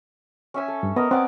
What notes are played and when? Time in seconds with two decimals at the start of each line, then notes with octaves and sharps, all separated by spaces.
0.54 C#4 E5 G#5
0.68 A4
0.83 G2
0.96 B3 A#4 D#5
1.11 B3 C4 D5 G#5